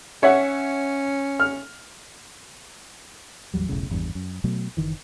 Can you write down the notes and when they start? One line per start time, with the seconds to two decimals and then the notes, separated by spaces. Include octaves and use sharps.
0.23 C#4 C#5 E5 F#5
1.40 F6
3.54 A1 E2 F#3 G3
3.69 E1 B1 A2 C#3
3.90 G#1 E2 G2
4.15 F#2
4.44 B2 F#3 A3
4.77 F#1 D#3 E3